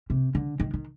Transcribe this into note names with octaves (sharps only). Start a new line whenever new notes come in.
C3
D3
D#3
D#3